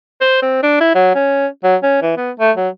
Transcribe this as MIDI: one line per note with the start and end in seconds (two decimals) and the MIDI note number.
0.21 0.42 72
0.42 0.59 60
0.63 0.79 62
0.81 0.95 64
0.95 1.11 54
1.15 1.47 61
1.64 1.76 54
1.83 2.00 61
2.02 2.13 52
2.18 2.31 59
2.40 2.51 57
2.57 2.69 54